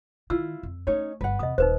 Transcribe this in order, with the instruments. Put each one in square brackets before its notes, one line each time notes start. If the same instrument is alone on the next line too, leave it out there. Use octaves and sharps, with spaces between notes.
[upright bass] D#3 [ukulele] E4 F4 [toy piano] E6
[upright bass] F2
[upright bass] A3 [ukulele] C#4 D#4 C#5
[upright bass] G1 [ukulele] B4 F#5
[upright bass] E2 C3 [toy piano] D#5 D#6
[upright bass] D#1 D#3 [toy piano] D#4 B4 C5